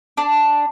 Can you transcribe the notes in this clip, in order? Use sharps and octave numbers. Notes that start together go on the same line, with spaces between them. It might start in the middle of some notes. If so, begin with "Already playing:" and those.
D4